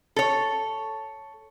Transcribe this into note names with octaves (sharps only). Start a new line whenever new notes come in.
A4 C#5